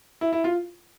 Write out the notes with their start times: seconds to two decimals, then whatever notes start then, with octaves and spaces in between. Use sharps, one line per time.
0.21 E4
0.33 E4
0.44 F4